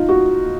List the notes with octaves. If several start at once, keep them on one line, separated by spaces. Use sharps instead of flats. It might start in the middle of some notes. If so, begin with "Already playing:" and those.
Already playing: D#4 F4
F#4